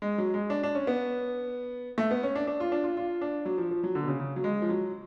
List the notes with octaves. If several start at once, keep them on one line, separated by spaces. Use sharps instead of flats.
G#3
F#3
G#3
D4
D4
C#4
B3
A3
B3
C#4
D4
D4
F4
D4
F4
F4
D4
F#3
F3
F3
F#3
D3
B2
C#3
C#3
F#3
G#3
F3
F#3